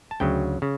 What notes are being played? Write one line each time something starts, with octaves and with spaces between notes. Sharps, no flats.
A5
D2 C#3 F#3 G5
C#3